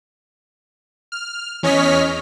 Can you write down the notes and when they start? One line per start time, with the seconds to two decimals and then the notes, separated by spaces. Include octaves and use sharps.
1.12 F6
1.63 E2 C#4 C#5 D#5 F6 B6